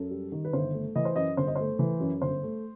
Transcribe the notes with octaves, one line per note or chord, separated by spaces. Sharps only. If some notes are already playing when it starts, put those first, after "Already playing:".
Already playing: F#2 A4
G3
D#3
B4
G1 C5
A3
E3 D#5
C5
F#2 D#5
G1 C5
D#5
A3 C5
E3
F#2
G1 C5
A3